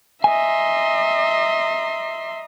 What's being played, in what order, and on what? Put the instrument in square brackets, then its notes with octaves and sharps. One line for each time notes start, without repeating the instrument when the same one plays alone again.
[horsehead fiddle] D#5 A#5 [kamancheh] E5 C6 [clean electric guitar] G#5